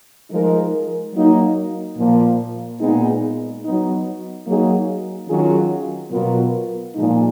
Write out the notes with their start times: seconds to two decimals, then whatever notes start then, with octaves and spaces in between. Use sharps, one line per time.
0.30 F3 G#3 D#4 A#4
1.14 F#3 A#3 D#4
1.97 A#2 F3 A#3
2.80 A#2 G#3 B3 D#4 G#4
3.63 F#3 B3 D#4
4.46 F#3 A#3 D#4 G#4
5.28 D#3 F#3 C#4 F4 G#4
6.11 B2 F#3 B3 F4 A#4
6.94 A#2 F3 G#3 D#4